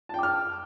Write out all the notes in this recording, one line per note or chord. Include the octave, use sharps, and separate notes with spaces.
G5 A5 D6 F6